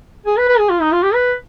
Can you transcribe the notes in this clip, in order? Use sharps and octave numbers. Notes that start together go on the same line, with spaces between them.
G#4
B4
B4
G#4
F4
D#4
F4
G4
B4